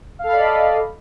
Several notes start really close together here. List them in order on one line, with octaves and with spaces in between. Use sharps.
F5 A4 B5 D5 D#5